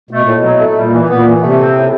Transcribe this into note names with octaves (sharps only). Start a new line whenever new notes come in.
B2 A3
A#2
A2
B2
F#3
A3
A#2 G3
E3
A#2 B3
E3
C3 A3
C4
A2